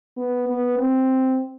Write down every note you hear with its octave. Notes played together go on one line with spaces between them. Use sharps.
B3
B3
C4